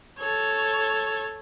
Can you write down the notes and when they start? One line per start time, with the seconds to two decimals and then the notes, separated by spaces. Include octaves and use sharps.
0.18 A4 C#5